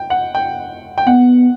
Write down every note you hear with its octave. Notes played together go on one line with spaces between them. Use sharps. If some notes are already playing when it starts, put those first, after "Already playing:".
Already playing: G5
F#5
G5
G5
B3 F#5